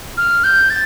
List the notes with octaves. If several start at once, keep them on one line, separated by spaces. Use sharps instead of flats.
F6
G6
A6